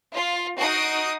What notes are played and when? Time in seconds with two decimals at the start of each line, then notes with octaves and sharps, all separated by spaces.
0.15 F4
0.58 D#4 F#4 D#6 C7 D7